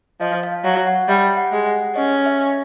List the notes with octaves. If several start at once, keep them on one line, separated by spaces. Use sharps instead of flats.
F3 D#5
F5
F#3 F#5
F#5
G3 E5
F#5
G#3
F#5
C#4 D#5
E5